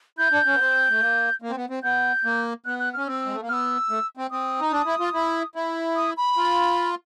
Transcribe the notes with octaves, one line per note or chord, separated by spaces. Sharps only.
E4 G6
D4
C#4
B3
C4
A3
A#3
A#3
C4
B3
C4
B3 G6
A#3
B3 F#6
F#6
C#4 F6
C4 E6
G#3
A3
A#3
B3 E6 F6
A3
C4
C4 D#6
D#4
D4
E4
F4
E4
E4
D#6
B5
F4